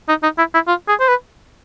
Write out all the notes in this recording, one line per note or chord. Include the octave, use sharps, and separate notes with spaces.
D#4
D#4
E4
E4
F4
G#4
C5
B4